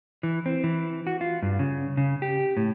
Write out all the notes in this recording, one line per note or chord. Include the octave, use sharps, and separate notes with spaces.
E3
C4
E3
F#4
F4
G2
C#3
C#3
G4
A2